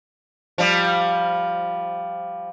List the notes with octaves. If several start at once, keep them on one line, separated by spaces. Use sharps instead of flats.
F3 G3